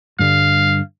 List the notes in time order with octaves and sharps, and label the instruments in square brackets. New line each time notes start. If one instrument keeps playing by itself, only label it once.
[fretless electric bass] G2 D3 G3 [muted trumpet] F5